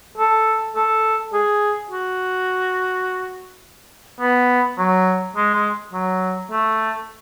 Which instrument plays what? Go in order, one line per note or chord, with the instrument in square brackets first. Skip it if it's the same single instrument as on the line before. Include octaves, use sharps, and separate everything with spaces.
[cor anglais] A4
A4
G#4
F#4
B3
F#3
G#3
G#3
F#3
A3